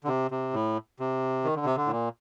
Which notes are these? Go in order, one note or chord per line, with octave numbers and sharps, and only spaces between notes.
D3
C3
C3
A2
C3
D#3
D3
C3
D3
A2
A#2